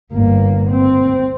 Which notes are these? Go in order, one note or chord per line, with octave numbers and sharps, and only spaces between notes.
G1 A#3
C4